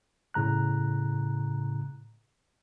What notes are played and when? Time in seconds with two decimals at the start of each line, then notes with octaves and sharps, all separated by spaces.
0.34 A2 C#3 A#5 F#6